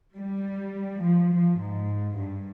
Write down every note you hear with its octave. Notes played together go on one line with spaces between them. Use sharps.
G3
F3
F3
G#2
G2